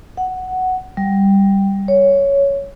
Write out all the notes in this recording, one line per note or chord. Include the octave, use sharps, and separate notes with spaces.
F#5
G3
C#5